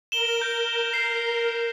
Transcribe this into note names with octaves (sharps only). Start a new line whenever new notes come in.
A#4 E7 G7
G6
C7